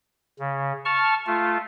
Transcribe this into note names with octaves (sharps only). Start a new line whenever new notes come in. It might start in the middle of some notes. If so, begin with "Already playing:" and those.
C#3
A5 C#6 F6
A3 F4